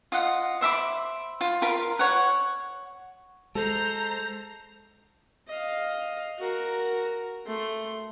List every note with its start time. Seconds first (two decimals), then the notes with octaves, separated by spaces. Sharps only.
0.12 F4 D#5 F#5
0.61 C5 E5 B5 D6
1.41 F4
1.62 F4 A#4 F5 B5
1.99 C#5 F#5
3.55 G#3 A4 C5 A#5
5.48 D#5 F5
6.38 F#4 A#4
7.46 A3 C6